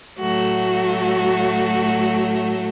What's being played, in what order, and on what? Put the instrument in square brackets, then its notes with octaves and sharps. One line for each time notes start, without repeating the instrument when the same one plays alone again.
[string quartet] A2 F#3 A3 F#4